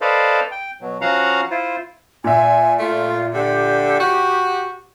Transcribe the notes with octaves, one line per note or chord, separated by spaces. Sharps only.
A4 B4 C5 D5 D#5 F5
G5
B2 F#3
F3 C#4 F#4 F5 F#5 A#5
E4 F4 C5
A#2 E5 G#5
A3 F4
D3 G4
F#4